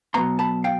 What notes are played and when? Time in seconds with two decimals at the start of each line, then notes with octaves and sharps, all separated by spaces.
0.14 B2 F#3 B3 A#5 C6
0.39 A5 B5
0.64 F5 G5